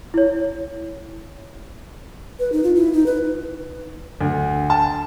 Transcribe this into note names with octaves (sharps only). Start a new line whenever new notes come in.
E4 C#5
B4
D#4
F4
E4
D#4
B4
D2
A5